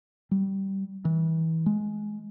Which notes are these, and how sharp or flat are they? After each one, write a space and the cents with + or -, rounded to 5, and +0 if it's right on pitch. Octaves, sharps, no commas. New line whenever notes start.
G3 -15
E3 -30
G#3 +15